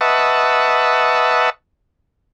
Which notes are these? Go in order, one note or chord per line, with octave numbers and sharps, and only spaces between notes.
B4 D#5 E5 F#5 A5 C#6